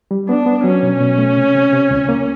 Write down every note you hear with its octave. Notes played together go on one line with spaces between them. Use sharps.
G3
B3 D4
B3
F#3 C#4
B2
B2
A3
C3
C3
C3
C#2
A#3